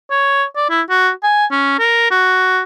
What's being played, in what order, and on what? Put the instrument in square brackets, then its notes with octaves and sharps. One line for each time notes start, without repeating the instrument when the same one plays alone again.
[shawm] C#5
D5
E4
F#4
G#5
C#4
A#4
F#4